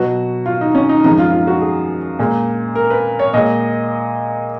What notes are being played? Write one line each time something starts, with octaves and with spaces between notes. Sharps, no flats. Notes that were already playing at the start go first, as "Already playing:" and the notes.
Already playing: B2 F#3 F#4
F4
D#4
C#4
D#4
F#2 F3 G#3 D#4
F4
F4
F#4
G#4
A#2 G#3
A#4
B4
C#5
A#2 G#3 D#5